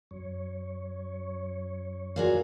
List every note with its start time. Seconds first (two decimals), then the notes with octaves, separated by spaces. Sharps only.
0.11 F#2 C#5
2.16 A#2 F#4 G#4 F5